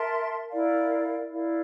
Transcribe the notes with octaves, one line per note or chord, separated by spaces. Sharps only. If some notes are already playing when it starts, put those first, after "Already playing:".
Already playing: A#4 E5 A5 C6
E4 A#4 D5 F5
E4 A#4 D5 F5